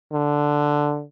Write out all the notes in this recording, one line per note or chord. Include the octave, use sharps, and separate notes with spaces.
D3